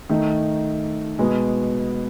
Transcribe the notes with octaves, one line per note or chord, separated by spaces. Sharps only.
D#3 A3 D#4
B2 G#3 B3